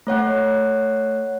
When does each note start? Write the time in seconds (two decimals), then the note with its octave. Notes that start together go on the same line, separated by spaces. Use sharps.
0.07 A3 C#5 F#5 F#6